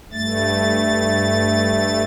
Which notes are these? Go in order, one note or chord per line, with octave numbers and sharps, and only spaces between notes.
G2 A3 A6